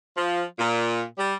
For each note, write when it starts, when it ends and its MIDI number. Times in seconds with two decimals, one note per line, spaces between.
0.17 0.44 53
0.59 1.04 46
1.18 1.35 55